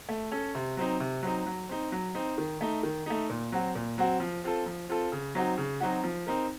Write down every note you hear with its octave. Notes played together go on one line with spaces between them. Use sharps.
A3
C#4 A4
C3
F#3 C4 D#4
C3
F#3 C4 D#4
F#3
C4 D#4
F#3
C4 D#4
D#3
A3 D#4
D#3
A3 D#4
A#2
F#3 C4 F#4
A#2
F#3 C4 F#4
F3
C4 F4 A4
F3
C4 F4 A4
C#3
F#3 C4 D#4 F#4
C#3
F#3 C4 D#4 F#4
F3
C4 D#4 A#4